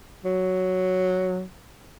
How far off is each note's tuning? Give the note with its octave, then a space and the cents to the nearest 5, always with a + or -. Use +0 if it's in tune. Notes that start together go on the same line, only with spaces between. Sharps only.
F#3 +0